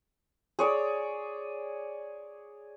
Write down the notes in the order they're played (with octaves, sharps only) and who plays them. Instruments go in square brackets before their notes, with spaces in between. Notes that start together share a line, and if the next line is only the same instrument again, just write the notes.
[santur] G#4 C#5 D5